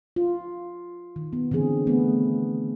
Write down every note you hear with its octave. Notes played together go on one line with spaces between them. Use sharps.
F4
D#3
B3
D3 E3 C4 G#4
A3 B3